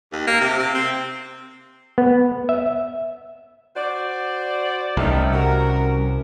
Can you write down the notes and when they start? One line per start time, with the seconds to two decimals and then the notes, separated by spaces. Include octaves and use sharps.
0.13 D#2
0.27 A#3
0.41 C3
0.58 C3
0.74 C4
1.98 B3
2.49 E5
3.76 F#4 C5 D5
4.97 C2 D#3 G3 A3 C#4
5.33 F#4 A#4